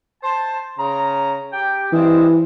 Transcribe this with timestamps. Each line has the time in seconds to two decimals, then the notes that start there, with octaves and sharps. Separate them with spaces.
0.22 C5 A5
0.79 C#3 A#5
1.53 G4 G5
1.93 G2 E3 G#3 C4